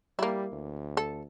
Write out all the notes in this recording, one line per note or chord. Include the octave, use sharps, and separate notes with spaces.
G3 A#3 E4
D2
A4